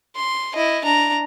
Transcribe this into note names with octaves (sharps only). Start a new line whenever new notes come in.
C6
E4 D#5
D4 A#5